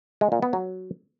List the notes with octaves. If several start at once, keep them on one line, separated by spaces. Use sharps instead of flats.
G#3
A#2
B3
F#3